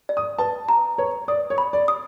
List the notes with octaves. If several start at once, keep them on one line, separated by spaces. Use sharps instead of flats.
D5
D#6
B4 A5
A#5
B4 C#5
D5 D#6
C#5
B5
D5
D#6